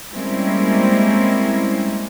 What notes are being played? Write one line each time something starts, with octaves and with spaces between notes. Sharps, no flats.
G3 G#3 A#3 C4 C#4 E4